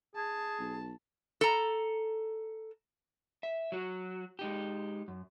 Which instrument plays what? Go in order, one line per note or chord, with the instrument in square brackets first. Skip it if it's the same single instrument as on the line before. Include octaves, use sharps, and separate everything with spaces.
[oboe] G#4 [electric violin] A5
[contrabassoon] B1
[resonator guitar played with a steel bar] A4 A#5
[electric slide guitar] E5
F#3 F#4
G#3 D#4 G4
F#2